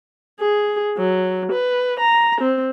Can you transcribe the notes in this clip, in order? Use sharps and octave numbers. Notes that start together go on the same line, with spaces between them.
G#4
F#3
B4
A#5
C4